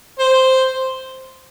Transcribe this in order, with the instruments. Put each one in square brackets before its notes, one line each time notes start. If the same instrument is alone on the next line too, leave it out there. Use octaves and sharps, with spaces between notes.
[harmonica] C5